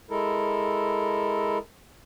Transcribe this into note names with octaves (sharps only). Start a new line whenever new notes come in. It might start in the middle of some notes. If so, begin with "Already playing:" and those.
G#3 E4 A4 A#4